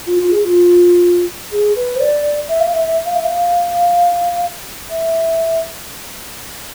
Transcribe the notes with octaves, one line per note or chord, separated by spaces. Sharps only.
F4
F4
G#4
F4
G#4
B4
C5
D5
E5
F5
E5
E5
F5
E5
F5
E5